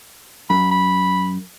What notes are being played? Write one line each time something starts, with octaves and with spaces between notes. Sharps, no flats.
F#2 B5
B5